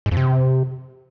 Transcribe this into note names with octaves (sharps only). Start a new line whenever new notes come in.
G#2
F2
C3